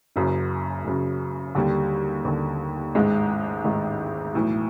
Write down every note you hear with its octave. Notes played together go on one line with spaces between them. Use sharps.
F#1 F#2 C#3
F#1 F#2 C#3
D#2 D3 G3
D#2 D3
A1 G#2 D#3 G#3
A1 G#2 D#3
B1 A2 E3